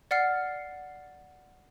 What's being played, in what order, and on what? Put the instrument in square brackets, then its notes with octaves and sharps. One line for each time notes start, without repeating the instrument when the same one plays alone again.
[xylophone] D5 F#5 F6 C7